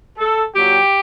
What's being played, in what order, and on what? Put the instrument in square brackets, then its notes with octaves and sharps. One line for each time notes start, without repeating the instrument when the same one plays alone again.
[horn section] A4
A#2 F#3 G4